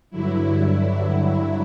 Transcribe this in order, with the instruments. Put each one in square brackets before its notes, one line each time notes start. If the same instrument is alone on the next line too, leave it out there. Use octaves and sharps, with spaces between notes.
[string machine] G2 D3 F#3 E4